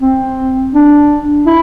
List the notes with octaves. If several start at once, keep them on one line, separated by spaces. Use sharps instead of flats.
C4
D4
E4